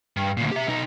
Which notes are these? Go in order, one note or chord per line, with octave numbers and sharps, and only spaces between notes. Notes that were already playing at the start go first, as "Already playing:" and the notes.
G2
D2 A#2
G4 E5
B2 D#4